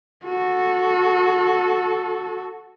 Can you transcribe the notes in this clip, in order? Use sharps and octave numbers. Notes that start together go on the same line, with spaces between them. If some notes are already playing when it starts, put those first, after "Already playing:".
F#4 A4